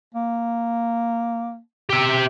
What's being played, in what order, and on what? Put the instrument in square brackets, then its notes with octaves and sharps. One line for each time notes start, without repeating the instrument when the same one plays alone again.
[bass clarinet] A#3
[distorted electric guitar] G4 E5